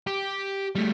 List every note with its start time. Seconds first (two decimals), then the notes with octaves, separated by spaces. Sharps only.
0.07 G4
0.75 G3 A3